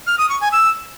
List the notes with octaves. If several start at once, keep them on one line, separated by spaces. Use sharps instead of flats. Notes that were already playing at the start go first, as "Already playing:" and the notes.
F6
D#6
C#6
G#5
E6